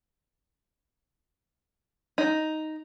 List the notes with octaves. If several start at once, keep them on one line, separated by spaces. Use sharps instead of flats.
D#4